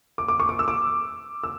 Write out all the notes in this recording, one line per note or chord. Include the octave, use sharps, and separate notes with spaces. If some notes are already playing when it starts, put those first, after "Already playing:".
D6
D6
C#6
D6
E6
D6
E6